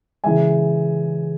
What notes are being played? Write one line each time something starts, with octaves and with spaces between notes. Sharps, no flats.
C#3 E3 G#3 E5 G#5